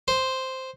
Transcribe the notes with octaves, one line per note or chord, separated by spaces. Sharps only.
C5